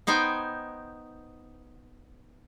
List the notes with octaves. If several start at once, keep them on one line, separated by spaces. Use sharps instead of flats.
B3 D#4 C5 G5 G#5